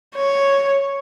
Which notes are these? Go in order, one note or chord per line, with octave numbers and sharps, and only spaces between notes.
C#5